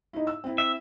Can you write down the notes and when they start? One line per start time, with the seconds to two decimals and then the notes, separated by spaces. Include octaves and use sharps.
0.13 D#4 E4
0.27 E6
0.44 C4 E4
0.58 E5